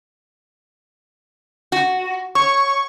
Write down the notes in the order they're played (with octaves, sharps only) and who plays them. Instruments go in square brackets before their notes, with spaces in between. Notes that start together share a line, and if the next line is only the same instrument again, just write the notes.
[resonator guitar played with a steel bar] F#4
[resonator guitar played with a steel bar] C#5 [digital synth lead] C#6